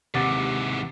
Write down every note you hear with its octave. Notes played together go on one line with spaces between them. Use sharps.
D#2 G#2 C3 E3 F#5 D6 A6